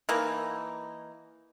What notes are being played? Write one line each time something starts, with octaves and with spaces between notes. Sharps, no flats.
E3 A#3 D#4